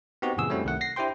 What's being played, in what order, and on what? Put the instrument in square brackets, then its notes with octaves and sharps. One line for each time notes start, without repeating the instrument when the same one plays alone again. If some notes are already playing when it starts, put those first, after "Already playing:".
[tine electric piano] B3 C4 D#4 F#4 G4
F#2 A#2 C#3 E3 G#4 E6
G3 A3 C4 C#4 E4 F#4
C2 D#3 A3 F#5
A#6 C7
D4 E4 G4 C5 G5 C6